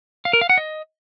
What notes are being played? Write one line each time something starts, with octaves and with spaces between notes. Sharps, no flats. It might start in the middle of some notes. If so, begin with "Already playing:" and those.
F5
A#4
F5
F#5
D#5